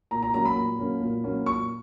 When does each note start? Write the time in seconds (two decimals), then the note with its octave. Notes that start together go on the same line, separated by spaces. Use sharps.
0.11 A#2 A#5
0.23 A#5
0.34 F#3 A#3 C#4 A#5
0.45 B5
0.56 A#2
0.79 F#3 A#3 C#4
1.02 A#2
1.24 F#3 A#3 C#4
1.46 A#2 C#6